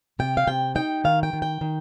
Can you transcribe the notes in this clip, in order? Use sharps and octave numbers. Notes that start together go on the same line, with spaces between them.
C3 G5
F5
C3 G5
D#4 G5
D#3 F5
G5
D#3
G5
D#3